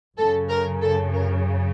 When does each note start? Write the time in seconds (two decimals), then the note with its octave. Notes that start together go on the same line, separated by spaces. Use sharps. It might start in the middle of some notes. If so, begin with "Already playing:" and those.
0.17 F#2 C#3 A4
0.49 A#4
0.81 A4
1.13 A#4